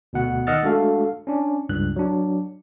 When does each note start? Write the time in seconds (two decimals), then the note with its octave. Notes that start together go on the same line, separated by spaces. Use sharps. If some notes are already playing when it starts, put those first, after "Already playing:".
0.13 D2 B2 F#5
0.47 D#3 D#5 F#5 E6 F6 A6
0.63 G#3 A3 D4 F#4 A4 F5
1.27 C#4 D4
1.69 C#2 G2 F#6
1.96 F#3 D4